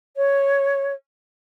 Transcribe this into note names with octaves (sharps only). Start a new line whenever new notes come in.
C#5